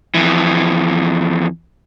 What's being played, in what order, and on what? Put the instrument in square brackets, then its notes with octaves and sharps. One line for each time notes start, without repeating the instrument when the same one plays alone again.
[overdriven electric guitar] F2 E3